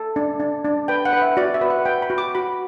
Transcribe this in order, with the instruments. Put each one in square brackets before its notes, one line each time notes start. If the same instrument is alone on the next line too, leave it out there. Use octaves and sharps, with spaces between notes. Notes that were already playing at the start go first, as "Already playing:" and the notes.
Already playing: [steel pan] A4
D4
D4
D4
B4 G5
F#5
B4
E5
F#4 D5
E5
B4
F#5
B4 G5
B5
F#4
D6
F#4 B5